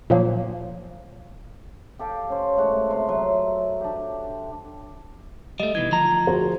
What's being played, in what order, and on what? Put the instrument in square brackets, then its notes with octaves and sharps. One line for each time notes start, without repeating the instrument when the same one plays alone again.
[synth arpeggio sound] A#2 F3 F#3 A#3
[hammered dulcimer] G4 A4 F5 G5
C#4 C5
G#3 A3 F#4
C3 C6
F#3
D4 G4
[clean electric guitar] G3 A3 [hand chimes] D#5
[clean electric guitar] B2 D#3 E3 [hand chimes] G#6
[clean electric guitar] D2 F3 A#5
[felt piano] F#4 G#4 C5